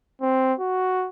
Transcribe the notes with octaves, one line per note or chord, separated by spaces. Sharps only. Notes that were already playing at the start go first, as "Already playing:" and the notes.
C4
F#4